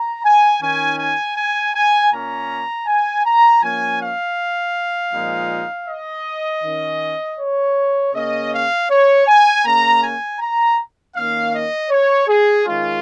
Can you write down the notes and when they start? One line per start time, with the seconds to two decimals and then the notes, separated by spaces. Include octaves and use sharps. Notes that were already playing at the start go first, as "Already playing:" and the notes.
Already playing: A#5
0.24 G#5
0.61 D#3 C#4 G#5
0.99 G#5
1.36 G#5
1.74 G#5
2.11 A#2 A#3 C#4 A#5
2.86 G#5
3.24 A#5
3.62 F3 A#3 C#4 G#5
4.00 F5
5.13 A#2 F3 G#3 D#4
5.88 D#5
6.63 D#3 C#4
7.39 C#5
8.13 C#3 A#3 C#4 D#5
8.51 F5
8.89 C#5
9.27 G#5
9.64 C#3 A#3 C#4 A#5
10.01 G#5
10.39 A#5
11.15 D#3 A#3 C#4 F5
11.53 D#5
11.90 C#5
12.27 G#4
12.65 D#3 G#3 C#4 F4